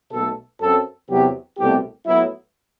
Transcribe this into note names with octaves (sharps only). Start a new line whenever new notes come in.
B1 B2 A3 A4
F#2 F#3 C4 A4
E2 C3 F#3 B3 G4
C2 B2 A3 C4 G4
A2 F#3 B3 E4